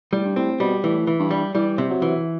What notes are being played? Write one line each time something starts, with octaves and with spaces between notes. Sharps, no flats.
A2 G3
G2
A2 C4
B2 G3
A2 E3
E3
G2
G3
E3 G3
C3
F#3
E3